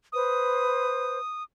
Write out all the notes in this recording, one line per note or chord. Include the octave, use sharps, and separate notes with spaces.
B4 C5 D#6